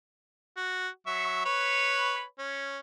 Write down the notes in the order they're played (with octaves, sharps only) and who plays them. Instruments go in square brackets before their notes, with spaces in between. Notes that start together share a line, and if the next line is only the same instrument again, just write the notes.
[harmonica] F#4
F#3 E5 C#6
B4 C#5 B5
C#4